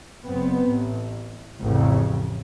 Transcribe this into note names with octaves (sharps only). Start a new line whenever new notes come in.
F#1 B3 C4
A1
A1 F2 C#3